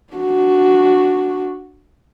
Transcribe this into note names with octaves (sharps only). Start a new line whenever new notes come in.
D4 F#4